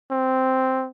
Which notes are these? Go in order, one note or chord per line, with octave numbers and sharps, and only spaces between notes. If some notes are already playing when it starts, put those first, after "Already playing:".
C4